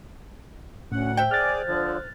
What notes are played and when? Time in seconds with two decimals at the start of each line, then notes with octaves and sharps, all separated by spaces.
0.92 D2 A2 C#4 F#5
1.17 C5 E5 G5
1.31 G#4 D5 F6 F#6 A6
1.68 D3 F3